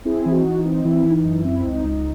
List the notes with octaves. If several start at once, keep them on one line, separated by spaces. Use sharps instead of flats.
C4 E4 G#4
E3
D#4 F#4
E3
D#4
C4
E3 E4
E3
D#4
F#2
E4
C4
C#2 D#4
C#2